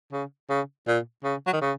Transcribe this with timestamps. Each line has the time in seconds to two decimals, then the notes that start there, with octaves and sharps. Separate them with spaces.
0.12 C#3
0.50 C#3
0.87 A#2
1.24 C#3
1.47 F#3
1.53 D#3
1.61 C#3